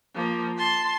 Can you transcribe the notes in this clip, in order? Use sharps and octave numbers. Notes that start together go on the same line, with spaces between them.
F3 A#3
A5 C6